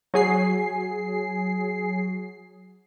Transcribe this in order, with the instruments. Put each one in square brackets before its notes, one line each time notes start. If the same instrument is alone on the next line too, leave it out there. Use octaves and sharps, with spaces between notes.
[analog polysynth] F#3 G#4 C7